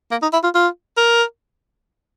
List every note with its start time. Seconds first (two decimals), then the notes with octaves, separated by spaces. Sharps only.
0.11 A#3
0.22 D#4
0.33 E4
0.44 F4
0.55 F4
0.97 A#4